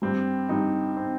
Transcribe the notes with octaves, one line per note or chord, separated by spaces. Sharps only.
G2 G3 C4
G2 G3 D#4
C4